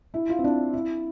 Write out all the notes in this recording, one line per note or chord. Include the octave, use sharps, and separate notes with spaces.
E4
F4
C4
D4
E4